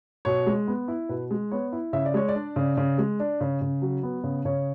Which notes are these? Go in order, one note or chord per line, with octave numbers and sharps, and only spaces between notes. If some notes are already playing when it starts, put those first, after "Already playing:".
B2 C#5
G#3
B3
E4
B2 B4
G#3
B3 C#5
E4
C#3 E5
D5
G#3 C#5
D5
D4
C#3
C#3
G#3
D4
C#3
C#3
F#3
B3
C#3
C#3 C#5